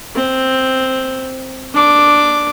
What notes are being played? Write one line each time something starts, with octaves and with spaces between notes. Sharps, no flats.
C4
D4 D6